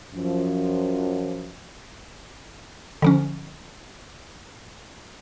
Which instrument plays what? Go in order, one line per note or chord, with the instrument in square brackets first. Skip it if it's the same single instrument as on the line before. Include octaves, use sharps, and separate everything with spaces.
[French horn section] F#2 F3
[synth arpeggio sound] D3 F3 C#4